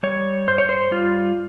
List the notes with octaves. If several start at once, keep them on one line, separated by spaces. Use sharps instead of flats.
G3 C#5
G2 C5
C#5
C5
G3 F4